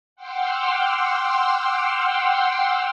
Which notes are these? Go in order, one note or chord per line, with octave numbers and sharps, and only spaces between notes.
F#5 G5 C6 D6 E6 F6